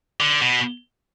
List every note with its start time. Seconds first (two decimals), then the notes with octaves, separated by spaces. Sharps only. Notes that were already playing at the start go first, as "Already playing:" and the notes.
0.20 D3
0.42 B2